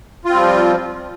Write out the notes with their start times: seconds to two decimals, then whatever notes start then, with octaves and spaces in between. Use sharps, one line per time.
0.25 F4
0.30 C4
0.34 G3
0.39 F3